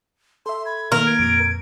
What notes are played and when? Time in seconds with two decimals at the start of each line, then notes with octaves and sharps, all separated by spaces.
0.46 A4 E5 C6
0.66 B5 G#6
0.92 D#3 A3 A#3 A#4 A#5
1.06 G#6 D7
1.19 F2 A#2 D7